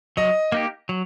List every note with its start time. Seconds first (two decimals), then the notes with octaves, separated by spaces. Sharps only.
0.17 F#3 D#5
0.52 A#3 D#4 G4
0.89 F#3